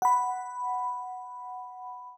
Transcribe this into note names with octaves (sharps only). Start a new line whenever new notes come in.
F#5 B5